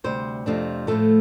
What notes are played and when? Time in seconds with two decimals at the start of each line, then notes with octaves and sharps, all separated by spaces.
0.04 D2 C3 G3 C5
0.46 F2 C3 F3 A3 D4
0.87 A2 F3 A3 A4